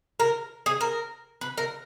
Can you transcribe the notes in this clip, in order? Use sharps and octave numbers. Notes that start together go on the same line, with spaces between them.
A#4
G#4
A#4
B4
A#4